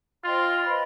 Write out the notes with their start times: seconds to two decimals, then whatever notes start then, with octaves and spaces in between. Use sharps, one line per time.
0.24 F4 C5 D#5 G5 C6
0.65 B4 D#5 B5